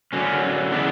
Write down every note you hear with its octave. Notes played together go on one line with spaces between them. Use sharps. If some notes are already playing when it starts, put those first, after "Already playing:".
D3 F#3 C#4
C#3 E3 B3 D4